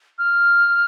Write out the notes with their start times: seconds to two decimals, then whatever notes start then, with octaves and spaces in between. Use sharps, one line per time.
0.18 F6